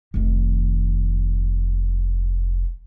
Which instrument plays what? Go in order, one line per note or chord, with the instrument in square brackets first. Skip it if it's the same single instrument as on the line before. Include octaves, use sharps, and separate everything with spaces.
[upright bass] F1 D#3